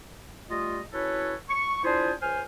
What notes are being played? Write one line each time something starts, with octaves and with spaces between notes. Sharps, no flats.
G3 A3 F4 D#5
C#4 E4 F#4 A4 B4 C#5
C#6
D4 E4 F4 G#4 C5
C#2 C5 G#5 F6